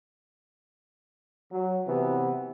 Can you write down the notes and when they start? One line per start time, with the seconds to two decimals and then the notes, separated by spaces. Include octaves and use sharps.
1.52 F#3
1.88 C3 E3 B3